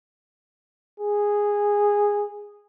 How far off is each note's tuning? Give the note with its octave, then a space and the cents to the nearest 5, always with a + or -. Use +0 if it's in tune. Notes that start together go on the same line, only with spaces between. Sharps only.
G#4 -10